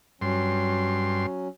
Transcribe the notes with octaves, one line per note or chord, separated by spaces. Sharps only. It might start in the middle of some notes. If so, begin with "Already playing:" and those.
G2 F#3 C#4 C6